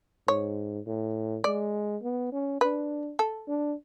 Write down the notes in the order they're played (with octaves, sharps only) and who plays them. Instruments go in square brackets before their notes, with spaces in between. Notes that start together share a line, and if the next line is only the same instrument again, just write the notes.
[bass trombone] G#2 [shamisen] C#5
[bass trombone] A2
[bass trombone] G#3 [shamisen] D5
[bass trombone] B3
C#4
[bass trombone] D4 [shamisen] B4
[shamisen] A4
[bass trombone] D4